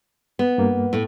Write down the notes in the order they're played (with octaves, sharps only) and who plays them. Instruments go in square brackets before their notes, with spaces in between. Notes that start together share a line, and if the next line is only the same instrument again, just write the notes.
[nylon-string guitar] B3
[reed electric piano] G2 A#3
[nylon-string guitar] A2 A3